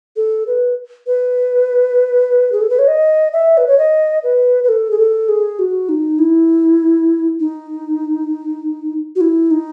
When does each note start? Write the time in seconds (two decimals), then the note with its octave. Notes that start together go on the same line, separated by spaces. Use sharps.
0.16 A4
0.47 B4
1.07 B4
2.52 G#4
2.61 A4
2.70 B4
2.79 C#5
2.88 D#5
3.33 E5
3.57 B4
3.67 C#5
3.78 D#5
4.23 B4
4.64 B4
4.69 A4
4.91 G#4
4.99 A4
5.29 G#4
5.59 F#4
5.89 D#4
6.19 E4
7.40 D#4
9.16 F#4
9.21 E4
9.51 D#4